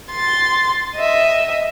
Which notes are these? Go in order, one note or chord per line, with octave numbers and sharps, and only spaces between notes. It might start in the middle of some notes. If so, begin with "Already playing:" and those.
C6 A6
D#5 E5